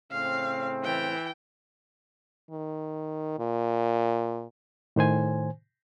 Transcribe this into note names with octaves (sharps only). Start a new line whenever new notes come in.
A2 C#3 C4 F5
E3 G5
D#3
A#2
A2 D#3 C5 G#5